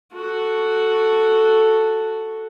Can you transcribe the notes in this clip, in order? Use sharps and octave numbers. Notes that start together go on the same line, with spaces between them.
F#4 A4